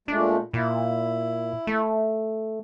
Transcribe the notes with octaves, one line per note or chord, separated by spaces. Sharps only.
A#2 G#3 A3 D4
A#2 E4
A3